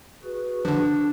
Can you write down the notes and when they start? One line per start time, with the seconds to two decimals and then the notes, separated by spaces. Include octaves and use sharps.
0.23 F#4 G#4 B4
0.65 D3 F3 D4